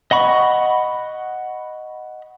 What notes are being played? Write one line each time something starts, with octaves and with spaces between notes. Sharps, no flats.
D#5 F#5 B5 C#6